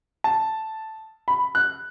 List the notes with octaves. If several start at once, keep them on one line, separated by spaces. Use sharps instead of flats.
A5
B5
F#6